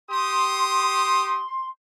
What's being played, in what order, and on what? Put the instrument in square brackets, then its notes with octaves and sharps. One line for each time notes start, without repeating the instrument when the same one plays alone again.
[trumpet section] G4 D#6 [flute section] C6